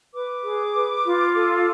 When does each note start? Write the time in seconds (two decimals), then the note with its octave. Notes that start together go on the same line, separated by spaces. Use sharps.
0.13 B4 D6
0.44 G#4
0.74 B4
1.04 F4
1.35 A4